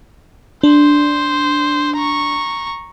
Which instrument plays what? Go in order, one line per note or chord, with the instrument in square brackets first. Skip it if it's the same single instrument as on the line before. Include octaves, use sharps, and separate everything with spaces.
[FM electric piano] D4 [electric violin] C5
[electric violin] A#5 C#6